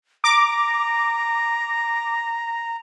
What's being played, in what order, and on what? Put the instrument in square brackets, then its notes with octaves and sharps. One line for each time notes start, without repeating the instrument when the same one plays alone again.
[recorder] A#5 [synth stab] D6